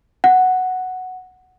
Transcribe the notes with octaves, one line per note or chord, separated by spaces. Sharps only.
F#5